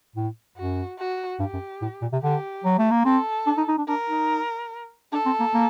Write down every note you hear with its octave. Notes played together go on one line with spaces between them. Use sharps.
A2
F#2 F#4
F#4
G2 G4
F#2
A2
A#2
C3
D3 G4
F#3
A3
A#3
C4 A4
D4
D#4
D#4
D4
D4 A#4
D#4
D4 A4
C4
A#3
A#3